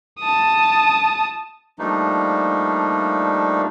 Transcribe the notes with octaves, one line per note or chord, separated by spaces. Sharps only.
A5 D#6
F3 G3 A3 A#3 D4 D#4